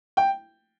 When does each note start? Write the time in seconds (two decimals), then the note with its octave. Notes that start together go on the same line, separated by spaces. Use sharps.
0.17 G5